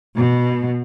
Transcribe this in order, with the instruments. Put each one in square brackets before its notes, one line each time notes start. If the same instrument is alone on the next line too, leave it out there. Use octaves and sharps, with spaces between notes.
[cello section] B2